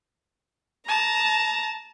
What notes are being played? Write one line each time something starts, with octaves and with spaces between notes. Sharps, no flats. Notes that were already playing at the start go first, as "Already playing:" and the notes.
A5 A#5